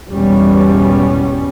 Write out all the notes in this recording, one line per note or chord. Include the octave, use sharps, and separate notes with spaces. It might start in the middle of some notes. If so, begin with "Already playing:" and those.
G#1 E2 B2 G3 B3 C#4